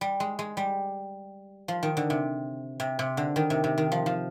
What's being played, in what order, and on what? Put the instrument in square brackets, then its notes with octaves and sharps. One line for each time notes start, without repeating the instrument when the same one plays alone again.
[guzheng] G3
G#3
G#3
G3
F3
D#3
D3
C3
C3
C3
D3
D#3
C3
C3
D#3
F3
F3